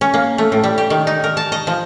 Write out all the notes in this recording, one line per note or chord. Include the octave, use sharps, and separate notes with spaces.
C#4
A#3
A3
A2
G3
G4
D#3
D#4
A#4
A5
D#5
F3